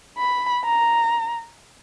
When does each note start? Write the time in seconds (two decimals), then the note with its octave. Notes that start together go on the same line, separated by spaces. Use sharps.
0.18 B5
0.65 A#5